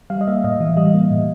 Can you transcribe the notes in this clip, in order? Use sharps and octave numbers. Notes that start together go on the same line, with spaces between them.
G3 F5
D#5
A#3 E5
A2 D#5
E3
G3 D#5
A#3
A2